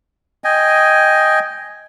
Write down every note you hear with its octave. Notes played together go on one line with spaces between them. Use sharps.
D#5 G5 G#5